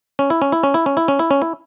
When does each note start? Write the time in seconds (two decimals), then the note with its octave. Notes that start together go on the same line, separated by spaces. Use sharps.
0.19 C#4
0.30 E4
0.42 C#4
0.52 E4
0.63 C#4
0.74 E4
0.86 C#4
0.97 E4
1.08 C#4
1.19 E4
1.31 C#4
1.42 E4